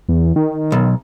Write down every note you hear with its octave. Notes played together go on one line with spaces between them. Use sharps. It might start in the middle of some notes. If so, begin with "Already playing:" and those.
E2
D#3
B1